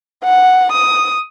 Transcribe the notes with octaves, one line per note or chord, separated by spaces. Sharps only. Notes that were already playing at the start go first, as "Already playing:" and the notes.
F#5
D#6